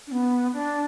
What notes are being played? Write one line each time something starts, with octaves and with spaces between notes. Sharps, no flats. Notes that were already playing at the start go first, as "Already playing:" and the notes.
D4
B3
D4